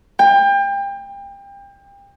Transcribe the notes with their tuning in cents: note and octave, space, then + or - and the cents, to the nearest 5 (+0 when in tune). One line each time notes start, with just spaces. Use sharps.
G5 +30